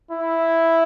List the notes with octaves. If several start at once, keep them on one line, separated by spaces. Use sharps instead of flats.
E4